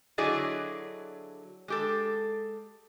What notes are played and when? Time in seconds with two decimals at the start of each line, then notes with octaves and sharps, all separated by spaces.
0.18 D3 F#3 E4 G#4 D5 D#5
1.68 G#3 G4 A4